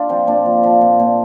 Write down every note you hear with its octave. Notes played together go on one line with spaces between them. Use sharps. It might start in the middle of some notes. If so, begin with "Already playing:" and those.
Already playing: D4 F4
F3 C4
A#2 D4
F3
F3
A#2
A#2